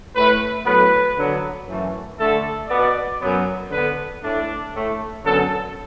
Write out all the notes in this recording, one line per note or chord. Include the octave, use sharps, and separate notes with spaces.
A2 A3 B4
A2 F#3 B3 B4
D3 F#3 B3
F#2 E3 A3
D3 A3 A4
B2 B3 D5
F#2 F#3 B3
D3 B4
B3
A2 A3 D4
A2 A3
F#2 D3 F#3 B3 A4